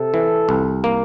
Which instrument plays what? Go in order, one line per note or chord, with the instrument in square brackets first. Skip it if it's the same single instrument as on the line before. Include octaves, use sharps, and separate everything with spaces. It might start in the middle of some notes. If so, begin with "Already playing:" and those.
Already playing: [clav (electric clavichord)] C3 [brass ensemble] A4
[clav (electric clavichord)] E3
C2
A#3